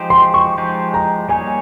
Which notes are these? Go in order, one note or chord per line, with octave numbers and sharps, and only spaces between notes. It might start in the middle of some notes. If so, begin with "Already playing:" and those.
Already playing: F3 G#3 D#4 G4 C5
C6
C#6
F3 G#3 D#4 G4 C5
A#5
G3 A#3 D#4 G#4 C#5 G#5